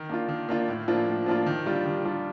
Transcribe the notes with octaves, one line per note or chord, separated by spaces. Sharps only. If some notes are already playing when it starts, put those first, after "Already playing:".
Already playing: D#3
A#3 D4 F4
D#3
A#3 D4 F4
A2
F3 A#3 D4 F4
A2
F3 A#3 D4 F4
D#3
G3 D4 F4
D#3
G3 D4 F4